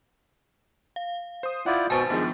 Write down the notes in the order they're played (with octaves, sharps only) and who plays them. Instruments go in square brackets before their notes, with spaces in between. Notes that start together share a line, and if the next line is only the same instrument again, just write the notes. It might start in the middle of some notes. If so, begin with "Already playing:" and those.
[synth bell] F5
[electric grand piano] C5 D#6
[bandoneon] E4 F4 D5 [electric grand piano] F#5 G6
[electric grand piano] G#1 A5 A6 [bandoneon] B2 [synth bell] B4 C5 G#5
[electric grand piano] G2 D#3 F3 [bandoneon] G#3 [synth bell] B3 D4